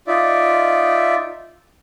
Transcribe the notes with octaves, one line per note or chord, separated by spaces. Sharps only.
D#4 F4 D5 E5